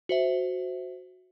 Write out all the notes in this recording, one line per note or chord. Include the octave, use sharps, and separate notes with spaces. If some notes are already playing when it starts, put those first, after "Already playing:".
F#4 C5 E5